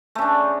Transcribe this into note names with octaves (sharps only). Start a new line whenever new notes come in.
C#3 A3 D4